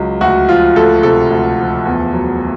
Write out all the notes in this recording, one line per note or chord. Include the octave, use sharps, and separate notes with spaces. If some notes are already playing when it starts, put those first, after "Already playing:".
Already playing: C#2 F#3
D2 F#4
F3 F4
D2 A4
C3 A4
D2
F3
E2
F#3